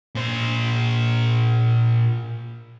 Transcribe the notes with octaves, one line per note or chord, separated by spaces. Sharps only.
A#2 C5